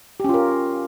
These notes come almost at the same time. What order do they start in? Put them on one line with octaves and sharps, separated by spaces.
G4 C#4 F4 A#4